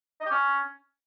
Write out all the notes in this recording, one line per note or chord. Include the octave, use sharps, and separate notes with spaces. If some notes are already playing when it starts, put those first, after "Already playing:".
D#5
G4
C#4